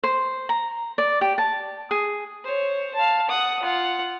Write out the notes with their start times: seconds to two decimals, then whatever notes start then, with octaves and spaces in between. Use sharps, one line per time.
0.03 C5
0.49 A#5
0.98 D5
1.21 G4
1.38 A5
1.91 G#4
2.44 C5 C#5
2.95 F5 A5
3.30 F#5 D#6
3.63 F4 F#5